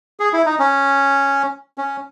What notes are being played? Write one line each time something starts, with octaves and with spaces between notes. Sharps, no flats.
G#4
E4
D#4
C#4
C#4